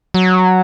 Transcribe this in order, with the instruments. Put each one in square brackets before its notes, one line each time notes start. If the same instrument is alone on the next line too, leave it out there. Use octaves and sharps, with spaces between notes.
[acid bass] F#3